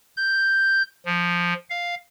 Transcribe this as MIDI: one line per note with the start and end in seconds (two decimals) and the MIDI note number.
0.17 0.82 91
1.05 1.54 53
1.70 1.95 77